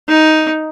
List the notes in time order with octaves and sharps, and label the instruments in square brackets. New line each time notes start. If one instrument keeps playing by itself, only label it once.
[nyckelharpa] D#4